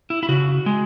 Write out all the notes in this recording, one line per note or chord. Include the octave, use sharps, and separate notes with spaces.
E4
E4
C#3 F#4
G#3